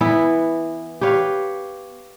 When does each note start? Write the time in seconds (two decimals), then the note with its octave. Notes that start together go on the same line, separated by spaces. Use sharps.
0.01 E3 B3 E4
1.01 G4 B4 C#5 F5